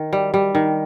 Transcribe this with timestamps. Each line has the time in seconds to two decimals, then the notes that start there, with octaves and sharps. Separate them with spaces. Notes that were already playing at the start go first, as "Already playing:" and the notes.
Already playing: D#3
0.13 G3
0.34 G3
0.55 D#3